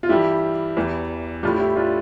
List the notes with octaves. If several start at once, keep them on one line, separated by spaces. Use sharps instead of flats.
F4
G2 E3 G3 E4 G4
E2 E3 G3
A2 G3 D4 F4
E4 G4
D4 F4